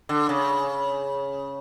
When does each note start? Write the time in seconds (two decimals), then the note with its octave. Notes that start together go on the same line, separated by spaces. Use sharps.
0.09 D3
0.29 C#3